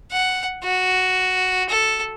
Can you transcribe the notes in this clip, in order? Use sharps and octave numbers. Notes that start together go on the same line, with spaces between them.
F#5
F#4
A4